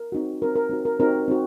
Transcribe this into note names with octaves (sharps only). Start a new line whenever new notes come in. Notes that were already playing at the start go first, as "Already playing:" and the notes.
Already playing: A#4
C4 D#4 F#4
C4 D#4 F#4 A#4
A#4
C4 D#4 F#4
A#4
C4 D#4 F#4 A#4
C4 D#4 F#4